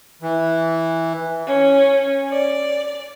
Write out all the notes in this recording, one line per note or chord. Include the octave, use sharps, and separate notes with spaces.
E3
C#4
D5